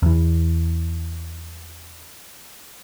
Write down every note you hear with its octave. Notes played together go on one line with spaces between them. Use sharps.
E2 E3